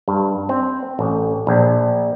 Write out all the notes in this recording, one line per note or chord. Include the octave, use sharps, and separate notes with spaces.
G2
C4
A1
A#1